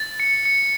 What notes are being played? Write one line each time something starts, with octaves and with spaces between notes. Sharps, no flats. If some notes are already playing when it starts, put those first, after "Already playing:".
Already playing: A6
C#7
C#7